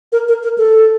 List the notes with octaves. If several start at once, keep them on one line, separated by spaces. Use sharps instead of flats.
A#4
A#4
A#4
A4